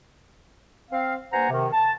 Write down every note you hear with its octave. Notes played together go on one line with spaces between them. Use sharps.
C4 F5
G2 A#3 C5 F#5 G#5 A#5
C3 D#3
A5